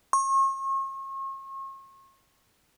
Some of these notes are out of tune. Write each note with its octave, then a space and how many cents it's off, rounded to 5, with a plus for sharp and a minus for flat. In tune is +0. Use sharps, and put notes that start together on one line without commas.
C#6 -40